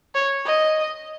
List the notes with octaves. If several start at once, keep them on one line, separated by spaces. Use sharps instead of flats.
C#5
D#5